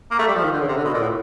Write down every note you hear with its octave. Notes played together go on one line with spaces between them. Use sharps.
A#3
A3
G3
F3
D#3
D3
C#3
C3
D3
B2
A#2
A2